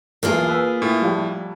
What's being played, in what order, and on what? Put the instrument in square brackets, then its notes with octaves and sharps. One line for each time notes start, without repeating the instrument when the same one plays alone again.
[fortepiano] B1 E2 A3 [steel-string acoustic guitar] A#3 F4 G#4
[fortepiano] B4 G#5 E6
[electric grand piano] A2
[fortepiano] A#1 G3